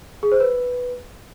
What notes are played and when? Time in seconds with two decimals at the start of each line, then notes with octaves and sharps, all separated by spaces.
0.23 G#4
0.32 C5
0.40 B4